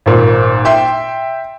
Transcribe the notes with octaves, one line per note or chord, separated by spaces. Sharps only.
G#1 A#2
E5 G5 C6